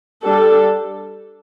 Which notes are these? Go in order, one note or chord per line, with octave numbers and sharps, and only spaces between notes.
G3 D4 A4